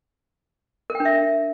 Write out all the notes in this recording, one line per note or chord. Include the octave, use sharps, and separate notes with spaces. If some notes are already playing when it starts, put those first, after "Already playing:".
A#4
G5
D4
E5